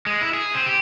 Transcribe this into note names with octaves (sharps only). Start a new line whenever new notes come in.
G#3
E4
G#4
C4
G4